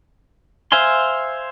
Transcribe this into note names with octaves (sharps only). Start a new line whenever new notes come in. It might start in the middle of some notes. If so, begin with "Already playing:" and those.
C5 E5 F5 G#5 C6